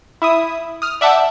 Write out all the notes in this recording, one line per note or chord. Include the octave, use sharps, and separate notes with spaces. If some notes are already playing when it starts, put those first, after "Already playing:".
E4 E5 D#6
D#6 F6
D5 E5 F#5 A5 D6 G6